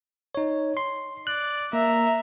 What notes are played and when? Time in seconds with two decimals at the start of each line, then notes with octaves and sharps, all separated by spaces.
0.35 D#4 C#5
0.77 C6
1.27 D5 F#6
1.73 A#3 E5 A#5